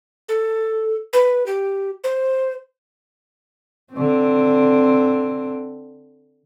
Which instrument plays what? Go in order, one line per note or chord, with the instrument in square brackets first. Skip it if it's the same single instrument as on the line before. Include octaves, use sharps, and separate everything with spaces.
[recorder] A4
B4
G4
C5
[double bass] D3 C4